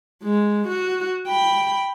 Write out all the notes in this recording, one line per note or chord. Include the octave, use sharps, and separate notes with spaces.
G#3
F#4
G5 B5